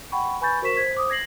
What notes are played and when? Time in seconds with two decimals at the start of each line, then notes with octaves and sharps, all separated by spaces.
0.12 F#5 G5 B5 C#6
0.41 B4 G#5 B5 C#6 G6 A6
0.62 F#4 A#4 C5 C#6 B6 E7
0.76 C5 G#6 B6
0.95 C5 D6 D#6
1.10 G#6 A#6 C7 F#7